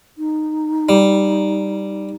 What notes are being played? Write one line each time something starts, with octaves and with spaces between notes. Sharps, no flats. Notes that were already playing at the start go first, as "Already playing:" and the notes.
D#4
G3